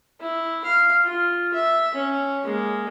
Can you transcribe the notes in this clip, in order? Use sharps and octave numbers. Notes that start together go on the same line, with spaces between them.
E4
F5
F4
E5
C#4
G#3 A#3